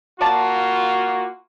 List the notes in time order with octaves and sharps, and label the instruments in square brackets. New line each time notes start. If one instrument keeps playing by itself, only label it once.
[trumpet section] A#3 F4 F#4 [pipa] D5 A5